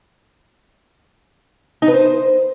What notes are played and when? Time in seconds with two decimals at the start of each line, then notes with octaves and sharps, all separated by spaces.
1.82 D#4
1.88 B4
1.94 C5